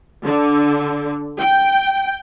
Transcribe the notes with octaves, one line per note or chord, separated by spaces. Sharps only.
D3
G5